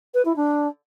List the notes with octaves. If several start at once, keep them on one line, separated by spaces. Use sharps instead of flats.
B4
E4
D4